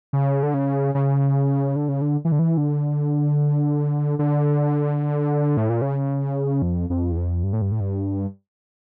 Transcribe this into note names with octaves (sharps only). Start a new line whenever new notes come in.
C#3
D3
C#3
C#3
D3
C#3
D3
E3
D3
E3
D3
D3
A2
A#2
C#3
F2
F2
E2
F2
G2
A2
G2
A2
G2